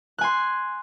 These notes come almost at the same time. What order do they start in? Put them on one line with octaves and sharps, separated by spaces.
F#6 G#5 C6